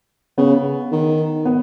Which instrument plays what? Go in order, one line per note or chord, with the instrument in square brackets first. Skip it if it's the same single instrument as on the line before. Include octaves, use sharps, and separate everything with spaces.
[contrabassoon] C#3 [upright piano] B3
[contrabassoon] D#3
[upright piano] B3